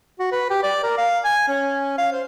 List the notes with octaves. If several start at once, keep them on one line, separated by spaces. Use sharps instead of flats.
F#4
B4
G4
D5
A#4
F5
G#5
C#4
F5
C5